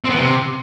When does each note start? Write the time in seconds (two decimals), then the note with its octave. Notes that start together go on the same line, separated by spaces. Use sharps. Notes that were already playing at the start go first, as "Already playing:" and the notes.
0.04 C4
0.10 B3
0.15 E3
0.20 C3